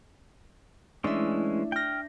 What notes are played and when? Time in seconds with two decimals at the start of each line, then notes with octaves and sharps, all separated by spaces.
1.04 E3 G#3 A3 C#4 D4 E4 E5
1.72 G5 F6 G6 A#6